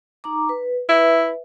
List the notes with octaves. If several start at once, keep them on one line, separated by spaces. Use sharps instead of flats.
D#4 A#5 D6
B4
E4 B4 E5